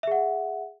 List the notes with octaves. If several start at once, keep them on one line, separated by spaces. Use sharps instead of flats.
G#4 E5 F#5